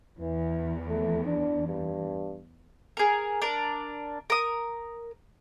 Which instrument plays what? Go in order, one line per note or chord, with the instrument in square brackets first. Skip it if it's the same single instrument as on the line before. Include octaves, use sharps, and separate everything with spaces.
[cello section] E2 [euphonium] E3
[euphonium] A3
D4
G2
[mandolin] G#4 A#4
D4 A#4
A#4 D#6